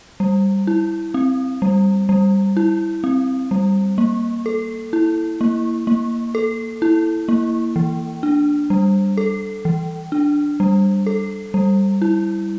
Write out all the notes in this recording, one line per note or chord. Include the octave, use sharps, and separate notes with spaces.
G3
E4
C4
G3
G3
E4
C4
G3
A#3
A4
E4
A#3
A#3
A4
E4
A#3
E3
D4
G3
A4
E3
D4
G3
A4
G3
E4